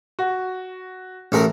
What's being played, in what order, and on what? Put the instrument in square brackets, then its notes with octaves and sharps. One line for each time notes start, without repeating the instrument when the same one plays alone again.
[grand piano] F#4
[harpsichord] A1 A3 A#4